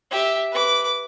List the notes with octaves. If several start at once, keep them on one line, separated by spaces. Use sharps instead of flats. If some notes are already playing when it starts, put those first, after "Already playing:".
G4 E5
B4 D6